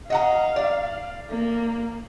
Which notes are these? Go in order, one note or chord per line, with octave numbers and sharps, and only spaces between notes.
D#5 F5 F#5 A#5
D5
A#3